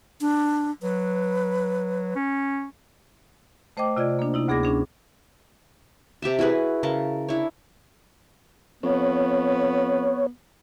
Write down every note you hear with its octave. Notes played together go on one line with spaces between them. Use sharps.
D4
F#3 B4
C#4
A3 C5 D#5 G5 D6
C3 F4 D5 D#5 G#6
A#3 D4
C3 D#4 E4
D2 B3 G#4 D6 G#6 A#6
C#4 D4 G#4
C3 G4 E5 A5
E4 F#4 G#4 B4
C#3 A#4 A5
D4 E4 C#5
F2 B3 C#5